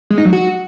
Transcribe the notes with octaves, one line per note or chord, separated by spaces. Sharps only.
G#3
D#4
F#3
F#4